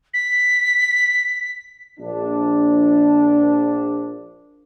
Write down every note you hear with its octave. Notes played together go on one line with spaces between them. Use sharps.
B6
A#1 D4